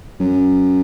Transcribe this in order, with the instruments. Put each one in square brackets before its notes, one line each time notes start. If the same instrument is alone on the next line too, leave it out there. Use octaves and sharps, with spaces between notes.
[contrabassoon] F#2